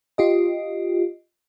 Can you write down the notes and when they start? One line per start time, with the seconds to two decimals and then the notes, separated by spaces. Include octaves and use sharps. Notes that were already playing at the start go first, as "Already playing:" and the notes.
0.18 F4 G4 D#5